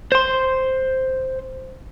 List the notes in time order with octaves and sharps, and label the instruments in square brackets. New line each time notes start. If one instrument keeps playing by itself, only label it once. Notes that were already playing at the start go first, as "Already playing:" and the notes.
[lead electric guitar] C5 C6